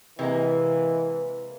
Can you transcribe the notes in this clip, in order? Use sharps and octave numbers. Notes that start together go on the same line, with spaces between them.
C3 E3 G#3 A#3 B4